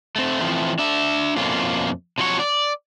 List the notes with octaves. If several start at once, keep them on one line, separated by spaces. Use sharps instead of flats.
A3 C4
E3 F3 A3 C4
D4 E5
F2 B2 A3 A#3 C#4 F4
C3 F3 F#3 D4 C#5
D5